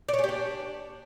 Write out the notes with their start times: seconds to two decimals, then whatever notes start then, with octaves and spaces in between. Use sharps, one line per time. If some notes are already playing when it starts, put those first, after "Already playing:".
0.09 D5
0.14 C#5
0.19 G#4
0.24 G4
0.29 D4